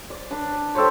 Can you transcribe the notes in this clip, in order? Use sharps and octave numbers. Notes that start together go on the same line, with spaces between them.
D5
D4 B4
G4 A4 C5 C#5